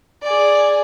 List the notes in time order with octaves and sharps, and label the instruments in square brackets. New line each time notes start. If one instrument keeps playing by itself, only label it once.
[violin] G#4 D5